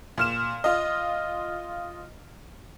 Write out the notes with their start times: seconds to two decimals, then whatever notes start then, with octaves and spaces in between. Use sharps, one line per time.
0.18 A#2 F6 E7
0.64 F4 D#5